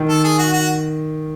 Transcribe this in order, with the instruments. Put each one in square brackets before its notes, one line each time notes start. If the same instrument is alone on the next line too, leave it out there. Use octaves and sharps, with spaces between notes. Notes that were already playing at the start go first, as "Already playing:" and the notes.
Already playing: [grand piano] D#3
[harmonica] A4
G#4
F#4
F#4